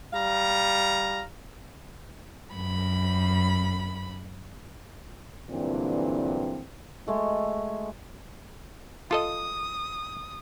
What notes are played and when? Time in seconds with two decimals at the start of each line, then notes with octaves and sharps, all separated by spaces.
0.13 G3 F5 A#5
2.54 F#2 B5
5.50 G2 A#2 D3 E3 F#3 C4
7.07 G#3 A3 F#4
9.11 F4 A4 D#5 D#6